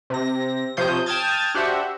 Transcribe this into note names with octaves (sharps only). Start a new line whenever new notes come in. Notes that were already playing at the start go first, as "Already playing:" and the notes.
C3 A#6
C3 F3 C5 C#5 D#6 G6
G5 A5 D#6 F6 G#6 A6
D4 F#4 G4 C5 E5 F#5